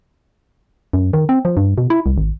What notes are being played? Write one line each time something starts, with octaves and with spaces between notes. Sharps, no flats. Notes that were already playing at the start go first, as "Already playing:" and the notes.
F#2
D#3
C4
F3
G2
B2
E4
C2
G#1